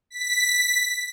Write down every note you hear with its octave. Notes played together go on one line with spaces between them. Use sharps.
B6